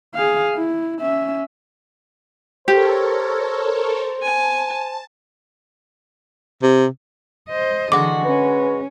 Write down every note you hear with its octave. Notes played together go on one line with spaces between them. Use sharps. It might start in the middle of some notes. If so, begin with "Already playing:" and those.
G#4 F5
E4
C#4 E5
G4 A4 A#4 C5 C#5
G#5 A5
C3
C5 D#5
D3 E3 G#3 F#4 D6
C#4 B4